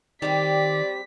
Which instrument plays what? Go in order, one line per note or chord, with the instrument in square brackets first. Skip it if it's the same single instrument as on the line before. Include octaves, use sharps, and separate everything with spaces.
[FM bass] D#3 [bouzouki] G3 C4 G4 [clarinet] D5 [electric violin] B6